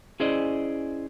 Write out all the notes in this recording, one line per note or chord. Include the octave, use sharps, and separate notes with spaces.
C#4 E4 G#4 C5 D5 D#5